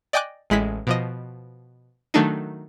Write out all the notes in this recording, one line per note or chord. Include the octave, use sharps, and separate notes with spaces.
D5 D#5 G5 G#5 D6 F#6
A1 G#3 E4 B6
B2 F3 D#5
D#3 F#3 A3 D4 D#4